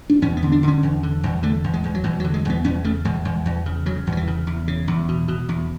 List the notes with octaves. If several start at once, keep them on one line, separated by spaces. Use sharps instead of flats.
D4
E2 C#4
B3
D3
D4
D3 C#4
E2
D3
E2
D3 A3
E2
G#3
E2
F#3
E2 E3
F#3
D3
G#3
E2 B3
E2 C#4
C#3 A3
E2 G#3
E2
E2
C#3
C#3 F#3
E2
F#3
E3
C#3
E2
C#3
E2
B2
B2
E2